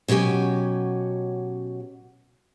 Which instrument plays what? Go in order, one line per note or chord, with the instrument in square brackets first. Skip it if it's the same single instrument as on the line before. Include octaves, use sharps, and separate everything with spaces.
[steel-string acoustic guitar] B2 F#3 C#4 G4 G#5